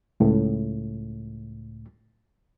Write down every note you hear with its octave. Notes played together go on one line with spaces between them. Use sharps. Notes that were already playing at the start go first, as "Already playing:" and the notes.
C#2 A2